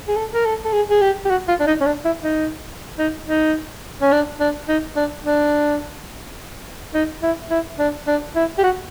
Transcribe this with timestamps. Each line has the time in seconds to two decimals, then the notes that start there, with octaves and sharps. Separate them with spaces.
0.08 G#4
0.16 A4
0.34 A#4
0.45 A4
0.65 A4
0.73 G#4
0.90 G#4
1.01 G4
1.25 G4
1.30 F#4
1.48 F4
1.60 D4
1.67 D#4
1.81 C#4
1.86 D4
2.05 E4
2.23 D#4
2.99 D#4
3.27 D#4
4.02 C#4
4.12 D4
4.40 D4
4.69 D#4
4.96 D4
5.25 D4
6.94 D#4
7.23 E4
7.51 E4
7.79 D4
8.08 D4
8.36 E4
8.59 G4
8.64 F#4